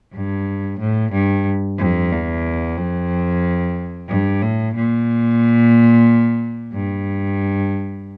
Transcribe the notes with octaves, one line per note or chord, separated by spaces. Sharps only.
G2
A2
G2
F2
E2
F2
G2
A2
A#2
G2